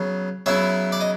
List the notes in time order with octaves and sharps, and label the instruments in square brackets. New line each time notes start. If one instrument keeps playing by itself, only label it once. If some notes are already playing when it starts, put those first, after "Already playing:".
Already playing: [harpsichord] C#3 F#3 B3
C#3 F#3 B3 E4 E5
D5
D#5